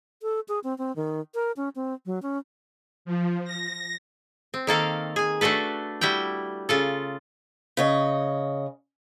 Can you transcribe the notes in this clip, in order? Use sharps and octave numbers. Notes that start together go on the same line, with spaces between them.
A4
G#4
C4
C4
D#3
A#4
C#4
C4
F#3
C#4
F3
A#6
C4
D#3 A#3 A4 F5
G#4 G#5
A3 D4 F#4 A4 B4
G3 E4 F#4 G5
C#3 F4 A4
C#3 C#5 D#5